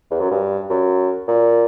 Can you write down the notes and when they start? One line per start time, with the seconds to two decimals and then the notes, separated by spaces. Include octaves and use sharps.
0.11 E2
0.21 F#2
0.31 G2
0.70 F#2
1.28 A#2